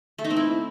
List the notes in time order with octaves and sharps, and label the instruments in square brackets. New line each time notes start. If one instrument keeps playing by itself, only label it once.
[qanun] A3
D#4
C4
E4